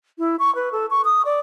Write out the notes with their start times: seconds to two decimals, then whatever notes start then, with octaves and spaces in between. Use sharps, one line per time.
0.19 E4
0.39 C#6
0.55 B4
0.72 A4
0.90 C#6
1.05 D#6
1.25 D5